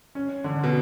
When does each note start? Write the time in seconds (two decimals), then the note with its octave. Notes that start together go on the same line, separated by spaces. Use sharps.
0.15 C#4
0.44 D3
0.63 B2